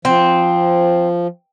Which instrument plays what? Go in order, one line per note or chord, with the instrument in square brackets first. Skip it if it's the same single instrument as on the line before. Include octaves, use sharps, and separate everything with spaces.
[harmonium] F3 [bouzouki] C4